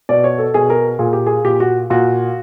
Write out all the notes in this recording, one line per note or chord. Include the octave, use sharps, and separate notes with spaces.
B2 D5
C#5
A4
B2 G#4
A#4
A#2 G#4
G4
G#4
A#2 G4
F#4
A#2 F#4